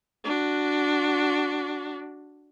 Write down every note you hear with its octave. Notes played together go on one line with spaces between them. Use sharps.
D4 F#4